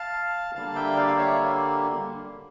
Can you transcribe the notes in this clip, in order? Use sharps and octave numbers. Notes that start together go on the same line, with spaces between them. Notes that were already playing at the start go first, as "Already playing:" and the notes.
Already playing: F5 A5
D3 G3 A#3 F5 A5
E5 G5
D5 F5
F5
C#5 E5